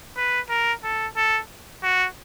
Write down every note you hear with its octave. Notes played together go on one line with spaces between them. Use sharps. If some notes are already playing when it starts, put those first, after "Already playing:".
B4
A#4
A4
A4
F#4